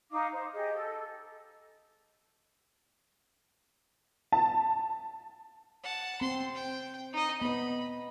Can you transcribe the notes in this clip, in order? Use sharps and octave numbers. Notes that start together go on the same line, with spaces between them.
D#4 F5 D6
C5
G4 G#4 D#5
A4
A5
F#5 A5
C4 C6
G5
D#4 D#5
B3 D#5 B5